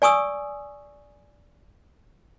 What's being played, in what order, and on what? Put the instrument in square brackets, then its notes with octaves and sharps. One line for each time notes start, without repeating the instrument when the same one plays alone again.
[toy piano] D5 G#5 C#6 D#6 E6